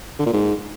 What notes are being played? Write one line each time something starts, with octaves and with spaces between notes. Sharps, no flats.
D3
A#2
G#2